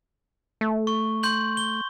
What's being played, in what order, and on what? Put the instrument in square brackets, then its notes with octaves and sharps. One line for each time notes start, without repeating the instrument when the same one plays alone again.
[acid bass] A3
[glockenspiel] C#6
C6 G6 F#7
G7